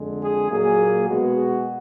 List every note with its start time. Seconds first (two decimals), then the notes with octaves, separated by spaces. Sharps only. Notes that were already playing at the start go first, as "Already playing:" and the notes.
Already playing: F2 D3 G#3
0.21 G#4
0.50 A#2 F#3 A#3 G#4
1.08 B2 G#3 B3 F#4